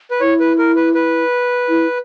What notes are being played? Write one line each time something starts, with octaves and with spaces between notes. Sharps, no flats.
B4
E4 C#5
B4
A#4
B4
B4
E4